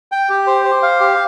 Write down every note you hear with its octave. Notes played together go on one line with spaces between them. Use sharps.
G5
G4
C5
C5
F5
G4